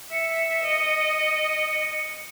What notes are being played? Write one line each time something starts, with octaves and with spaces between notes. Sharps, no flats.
E5 C#7
D#5